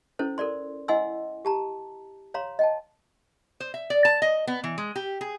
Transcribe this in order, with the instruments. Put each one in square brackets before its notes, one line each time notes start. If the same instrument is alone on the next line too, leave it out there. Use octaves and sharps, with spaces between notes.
[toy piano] C#4 E4 A4 C5
A4 A#4 D5 C6
E4 D#5 F#5 G#5 C6 E6
G4 A5 A#5
C#5 F5 A#5 C6
D#5 G5 A5
[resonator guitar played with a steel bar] C5
E5
D5
A5
D#5
B3
E3
G#3
G4
G#4